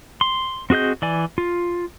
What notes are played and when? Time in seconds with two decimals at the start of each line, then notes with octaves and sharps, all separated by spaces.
0.21 C6
0.70 C4 F#4 G#4 D#5 G6
1.02 E3 D5 G#5
1.38 F4